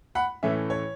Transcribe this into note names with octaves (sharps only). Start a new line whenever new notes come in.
F#5 B5
A2 E3 A3 C#4 E5
C#5